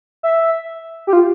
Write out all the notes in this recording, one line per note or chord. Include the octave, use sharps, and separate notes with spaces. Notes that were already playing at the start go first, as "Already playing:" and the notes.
E5
G4
F4